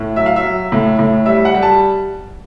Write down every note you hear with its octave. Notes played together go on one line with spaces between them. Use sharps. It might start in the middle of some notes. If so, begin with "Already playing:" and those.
Already playing: A2
F#3 E5
F5
E5
F#3
A2
A2
G3 E5
F#5
G3
A5